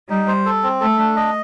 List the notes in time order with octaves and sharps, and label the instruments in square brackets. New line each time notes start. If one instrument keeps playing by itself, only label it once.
[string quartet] G3 [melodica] D#4
[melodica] C5
A4
C4
[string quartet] A3 [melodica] A4
[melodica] D4
D#5